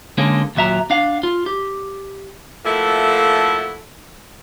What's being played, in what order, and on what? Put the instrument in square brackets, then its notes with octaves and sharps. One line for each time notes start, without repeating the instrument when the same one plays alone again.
[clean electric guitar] D3 G#3 A#3 C#4
D#2 A#2 F#3 E5 A#5
D4 F5 F#5
F4
G4
[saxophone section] F3 A3 A#3 E4 F#4 A4